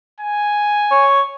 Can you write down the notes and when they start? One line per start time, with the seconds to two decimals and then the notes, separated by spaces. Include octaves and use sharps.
0.20 G#5
0.91 C#5